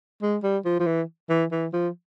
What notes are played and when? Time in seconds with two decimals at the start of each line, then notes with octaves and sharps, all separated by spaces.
0.22 G#3
0.43 G3
0.65 F3
0.79 F3
0.86 E3
1.30 E3
1.52 E3
1.73 F3